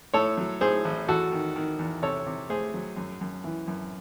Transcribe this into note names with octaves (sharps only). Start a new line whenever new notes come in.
A2 A4 C#5
F#3
A2 G#4 C5
A1
E2 F#4 A4
D#3
D#3
E2
C3 A4 C#5
C3
A3 G#4 C5
F#3
F#2
F#2
E3
F#2